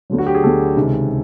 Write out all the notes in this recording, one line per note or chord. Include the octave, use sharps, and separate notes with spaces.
D2 D3 F#3
F#4
G4
G#4
D2 D3 F#3 A4
C#2 C3 D#3